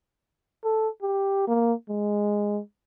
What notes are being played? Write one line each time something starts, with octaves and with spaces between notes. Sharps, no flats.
A4
G4
A#3
G#3